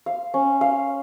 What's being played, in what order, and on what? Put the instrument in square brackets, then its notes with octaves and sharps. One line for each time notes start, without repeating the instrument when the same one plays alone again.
[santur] F5
C#4
F5